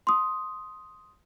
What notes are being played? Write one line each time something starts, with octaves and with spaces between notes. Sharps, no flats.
C6 D#6